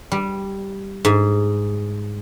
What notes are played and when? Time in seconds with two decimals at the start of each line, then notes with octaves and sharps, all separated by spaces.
0.12 G3
1.05 G#2